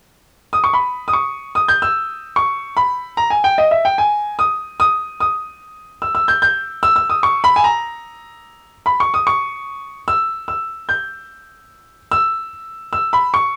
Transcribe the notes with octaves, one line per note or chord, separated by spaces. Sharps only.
D#6
C#6
B5
D#6
C#6
D#6
G6
E6
C#6
B5
A#5
G#5
G5
D#5
E5
G5
G#5
D#6
D#6
D#6
E6
E6
G6
G6
E6
E6
D#6
C#6
B5
G#5
A#5
B5
C#6
D#6
C#6
E6
E6
G6
E6
E6
B5
C#6